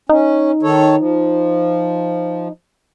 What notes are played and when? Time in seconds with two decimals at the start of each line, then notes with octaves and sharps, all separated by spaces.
0.09 C#4 D#4
0.63 D#3 A4 C#5
0.97 F3